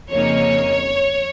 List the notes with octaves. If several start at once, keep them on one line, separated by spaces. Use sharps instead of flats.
F2 C#3 A#3 D#4 C#5